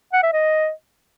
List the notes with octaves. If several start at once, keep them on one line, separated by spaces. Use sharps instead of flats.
F#5
E5
D#5